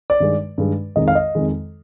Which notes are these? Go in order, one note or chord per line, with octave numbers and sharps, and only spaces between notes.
D5
G2 D#3 G#3
G2 D#3 G#3
F2 D#3 G#3 D#5
F5
D#5
F2 D#3 G#3